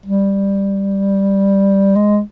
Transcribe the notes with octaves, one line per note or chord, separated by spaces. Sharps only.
G3
G#3